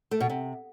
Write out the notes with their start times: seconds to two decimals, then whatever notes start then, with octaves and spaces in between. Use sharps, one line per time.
0.11 A3
0.20 B2
0.30 C3